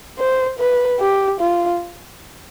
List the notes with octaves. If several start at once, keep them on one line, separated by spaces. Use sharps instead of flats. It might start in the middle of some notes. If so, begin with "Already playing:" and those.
C5
B4
G4
F4